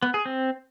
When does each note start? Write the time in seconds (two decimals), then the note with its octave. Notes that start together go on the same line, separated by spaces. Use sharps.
0.03 B3
0.14 G#4
0.25 C4